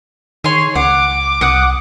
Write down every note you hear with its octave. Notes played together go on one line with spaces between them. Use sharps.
D#3 G#4 C#5 C6
C#2 F#5 D6
C2 F#5 D#6 F#6